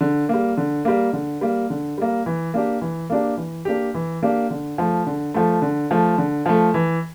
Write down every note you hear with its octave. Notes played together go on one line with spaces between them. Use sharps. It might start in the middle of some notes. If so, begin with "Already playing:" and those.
D3
G3 A#3
D3
G3 A#3
D3
G3 A#3
D3
G3 A#3
E3
A#3 D4 G4
E3
A#3 D4 G4
E3
A#3 D4 G4
E3
A#3 D4 G4
D3
F3 A3
D3
F3 A3
D3
F3 A3
D3
F3 A3
E3